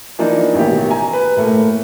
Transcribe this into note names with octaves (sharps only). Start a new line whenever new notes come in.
E3 F3 A#3 D4 D#4
A1 B2 D#3 G4
G#5 A#5
B4
A2 A3 A#3